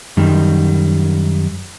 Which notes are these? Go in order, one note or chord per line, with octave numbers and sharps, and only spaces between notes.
F#2 D#3 G3